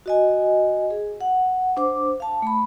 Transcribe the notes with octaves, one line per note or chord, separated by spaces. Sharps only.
F#4 D#5 G#5
G#4
F#5
D4 C5 D6
F5 A5
A3 B5